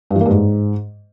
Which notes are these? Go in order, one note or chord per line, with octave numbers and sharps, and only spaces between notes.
G2
E3
A#3
G2
G#2